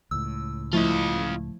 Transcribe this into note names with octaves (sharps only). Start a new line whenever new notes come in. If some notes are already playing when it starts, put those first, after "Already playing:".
C#2 A2 E6
F3 A3 E4 F4 D#5